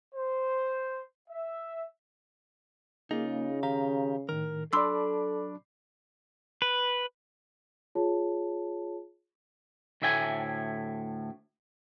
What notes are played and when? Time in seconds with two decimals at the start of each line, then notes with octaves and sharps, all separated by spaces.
0.13 C5
1.29 E5
3.11 C#3 A#3 D#4 F4 G#4
3.63 D#3 G4 F5 A#5
4.29 A2 D#3 A#4
4.73 F#3 D4 A4 D5 B5 C6 D6 E6
6.62 B4
7.95 F4 G#4 C#5 A5
10.02 D2 A2 E5 G5 G#5